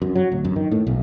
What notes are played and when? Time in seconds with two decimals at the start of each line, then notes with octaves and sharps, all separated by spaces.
0.02 F#2
0.15 F#3
0.32 D1
0.45 F#2
0.56 D#3
0.72 A2
0.87 B1